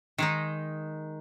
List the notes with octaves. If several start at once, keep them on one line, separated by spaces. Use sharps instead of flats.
D#3 G#3 D#4